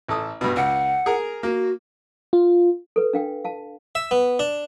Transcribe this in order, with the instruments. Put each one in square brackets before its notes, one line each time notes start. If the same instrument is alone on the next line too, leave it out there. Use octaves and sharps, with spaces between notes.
[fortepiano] A1 A4 D#6
G2 B2
[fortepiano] C#2 [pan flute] F#5
[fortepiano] G#4 A#4
[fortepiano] A#3 [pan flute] F#4
[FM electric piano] F4
[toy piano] A4 B4
D4 F5 G5
F5 A5
[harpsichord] E5
B3
D4